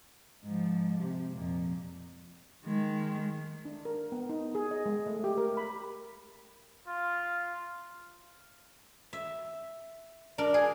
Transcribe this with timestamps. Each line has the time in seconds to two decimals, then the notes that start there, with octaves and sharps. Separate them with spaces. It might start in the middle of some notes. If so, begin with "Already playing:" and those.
0.44 G#2 F3
1.00 C3
1.33 F2 A#2
2.66 D#3 G#3
3.65 D4
3.85 A#4
4.12 B3
4.30 D#4
4.55 G#4
4.71 D#5
4.86 G#3
5.07 A3
5.24 G4
5.38 A#4
5.57 B5
6.88 F4
9.13 E5
10.38 D4 A#4 D5
10.54 G#4 G#5